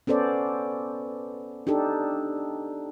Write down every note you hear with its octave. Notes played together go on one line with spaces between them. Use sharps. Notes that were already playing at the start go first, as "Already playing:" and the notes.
B3 C#4 A4 C5 D5
D4 D#4 G4 A4